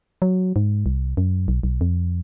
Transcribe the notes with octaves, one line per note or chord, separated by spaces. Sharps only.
F#3
G#2
C2
F#2
B1
B1
F2